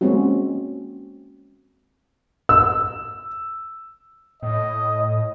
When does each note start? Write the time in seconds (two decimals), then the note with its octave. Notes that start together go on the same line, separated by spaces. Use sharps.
0.01 G#3 A#3 C4 C#4 F#4
2.49 E6
4.43 A2 D#5